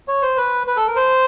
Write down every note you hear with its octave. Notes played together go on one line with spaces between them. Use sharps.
C#5
C5
B4
B4
A4
A#4
C5